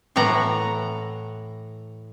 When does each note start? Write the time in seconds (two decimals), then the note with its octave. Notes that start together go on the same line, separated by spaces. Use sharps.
0.16 A2 E3 F#5 A#5